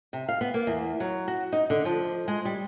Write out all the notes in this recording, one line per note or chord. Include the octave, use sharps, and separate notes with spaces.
C3
F5
B3
A#3
E2
F#3
F#4
D#4
D3
F3
G#3
G3